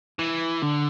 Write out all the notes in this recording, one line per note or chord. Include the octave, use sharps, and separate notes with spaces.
E3
D3